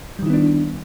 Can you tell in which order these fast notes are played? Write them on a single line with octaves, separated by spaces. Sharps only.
G3 D#3 E4 B3 D4